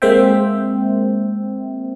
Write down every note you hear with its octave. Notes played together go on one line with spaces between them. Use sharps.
G#3 A#3 C4 C5 E5 G5